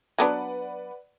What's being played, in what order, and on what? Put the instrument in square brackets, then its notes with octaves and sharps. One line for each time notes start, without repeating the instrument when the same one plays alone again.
[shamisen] F#3 B3 D4 [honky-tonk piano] B4 D5 F#5